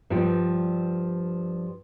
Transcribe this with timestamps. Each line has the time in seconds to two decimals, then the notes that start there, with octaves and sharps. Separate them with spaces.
0.10 G2 F3 G3 G5